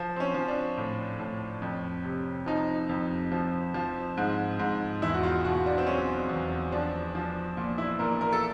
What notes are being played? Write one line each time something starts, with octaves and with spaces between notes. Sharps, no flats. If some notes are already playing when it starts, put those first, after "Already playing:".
Already playing: F3
C4
C#4
F3
D4
A2
A2
F2
C3
F3 D#4
F2
F3
F3
G#2
G#2
E2 E4
F#4
F4
B2 F#4
D4
C4
F#3 C#4
E2
F3 D4
F3
A#2
E4
A#2 A#4
A#4
A4